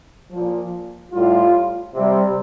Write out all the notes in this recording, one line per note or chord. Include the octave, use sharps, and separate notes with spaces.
A#2 F3
A2 G3 F4
C3 G3